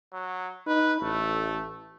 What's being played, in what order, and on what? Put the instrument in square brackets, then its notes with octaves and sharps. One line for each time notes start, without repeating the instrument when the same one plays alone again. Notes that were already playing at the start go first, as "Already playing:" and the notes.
[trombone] F#3
[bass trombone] D#4 [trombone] B4
[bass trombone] A1 [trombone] A3